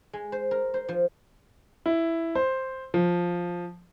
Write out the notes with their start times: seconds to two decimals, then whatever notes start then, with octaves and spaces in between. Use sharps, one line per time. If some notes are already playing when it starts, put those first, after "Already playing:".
0.13 G#3
0.32 C5
0.51 A#4
0.74 C5
0.89 F3
1.86 E4
2.35 C5
2.94 F3